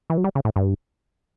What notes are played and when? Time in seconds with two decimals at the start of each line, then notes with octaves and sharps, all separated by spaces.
0.10 E3
0.17 F#3
0.24 G3
0.35 C#3
0.45 A2
0.56 G2